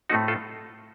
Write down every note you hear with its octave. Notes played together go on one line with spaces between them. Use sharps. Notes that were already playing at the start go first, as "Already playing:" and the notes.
A2 A3 C4 D#4 F#4
F4 A4